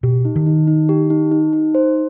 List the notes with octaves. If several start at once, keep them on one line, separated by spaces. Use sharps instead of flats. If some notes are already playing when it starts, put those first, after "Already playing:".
B2 G4
D#4
D#3
D#4
D#4
G4
D#4
D#4
D#4
C5